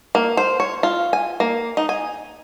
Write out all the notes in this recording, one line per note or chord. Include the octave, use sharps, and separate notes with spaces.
A#3
C5
C#5
F4
G#5
A#3
D#4
G#5